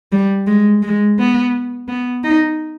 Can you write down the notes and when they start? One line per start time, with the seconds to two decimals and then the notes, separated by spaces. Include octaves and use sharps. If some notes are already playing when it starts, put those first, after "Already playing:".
0.12 G3
0.47 G#3
0.83 G#3
1.19 B3
1.88 B3
2.24 D#4